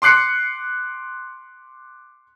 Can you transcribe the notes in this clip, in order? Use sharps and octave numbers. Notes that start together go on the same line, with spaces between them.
C6 D6 F#6 C7 C#7